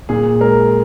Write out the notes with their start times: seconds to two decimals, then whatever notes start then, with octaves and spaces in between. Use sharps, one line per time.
0.09 A#2 G#4
0.40 G#3 A#4